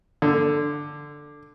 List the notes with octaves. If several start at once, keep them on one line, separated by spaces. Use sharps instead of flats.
D3